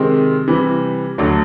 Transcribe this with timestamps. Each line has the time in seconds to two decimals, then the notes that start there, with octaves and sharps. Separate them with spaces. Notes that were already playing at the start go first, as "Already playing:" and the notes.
Already playing: C3 D#3 G#3 C4
0.47 C3 E3 G3
1.18 D2 D3 F#3